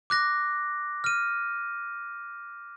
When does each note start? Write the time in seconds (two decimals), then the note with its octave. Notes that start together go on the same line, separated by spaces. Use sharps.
0.10 D6 F#6 A#6
1.04 F6 D#7